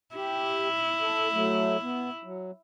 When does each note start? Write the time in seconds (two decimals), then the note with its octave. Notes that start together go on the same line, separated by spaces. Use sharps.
0.15 E4 G4
1.01 A4
1.33 F#3 A3
1.82 B3
2.24 F#3